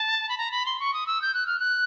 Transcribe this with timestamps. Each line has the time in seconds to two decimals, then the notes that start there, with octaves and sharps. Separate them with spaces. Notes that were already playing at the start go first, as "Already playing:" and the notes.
Already playing: A5
0.29 B5
0.38 A#5
0.51 B5
0.66 C6
0.80 C#6
0.94 D#6
1.06 E6
1.22 G6
1.34 F#6
1.46 F6
1.59 F#6